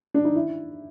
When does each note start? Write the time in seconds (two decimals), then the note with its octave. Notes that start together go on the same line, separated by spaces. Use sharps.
0.14 D4
0.25 D#4
0.35 E4